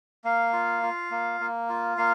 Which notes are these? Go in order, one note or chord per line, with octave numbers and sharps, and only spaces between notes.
A#3 F5
F4
F4
A#3
A#3
F4
A#3 F5